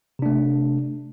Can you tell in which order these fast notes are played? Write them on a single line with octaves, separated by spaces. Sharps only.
C3 D4 A3